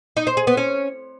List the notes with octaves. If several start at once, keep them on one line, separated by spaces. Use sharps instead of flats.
D#4
C5
G#4
B3
C#4